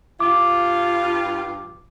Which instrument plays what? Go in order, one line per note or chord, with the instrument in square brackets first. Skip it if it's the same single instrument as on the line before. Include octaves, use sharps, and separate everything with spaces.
[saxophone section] G2 F4 [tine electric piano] D6